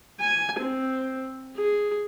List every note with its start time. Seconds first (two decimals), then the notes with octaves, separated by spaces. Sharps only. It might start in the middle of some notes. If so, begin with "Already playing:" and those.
0.20 G#5
0.60 C4
1.56 G#4